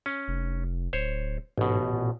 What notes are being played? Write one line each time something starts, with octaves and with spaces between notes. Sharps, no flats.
C#4
F1
D1 C5 C#5
A1 G#2 B2
A#2